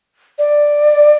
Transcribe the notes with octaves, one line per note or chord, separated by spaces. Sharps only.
D5